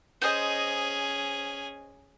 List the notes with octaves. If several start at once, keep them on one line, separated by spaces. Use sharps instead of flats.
C#4 G#4 C5 D#5